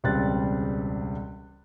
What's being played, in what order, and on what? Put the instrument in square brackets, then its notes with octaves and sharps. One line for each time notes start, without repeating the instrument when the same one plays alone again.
[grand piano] E1 C#2 G3 C4 F#6 A6